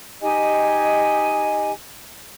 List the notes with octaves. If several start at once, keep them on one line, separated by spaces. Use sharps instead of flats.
D#4 G4 D#5 G#5